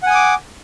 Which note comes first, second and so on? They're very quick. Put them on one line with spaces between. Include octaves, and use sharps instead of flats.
F#5 G#5 D#6 D6